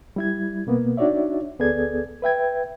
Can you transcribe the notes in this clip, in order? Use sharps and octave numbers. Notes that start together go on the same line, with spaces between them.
G3 E4 G#6
B2 A#3 B3
D4 D#4 F#4 C#5 D5 E5
D2 B3 G#4 A4 D5 G#6
B4 E5 G5 G#6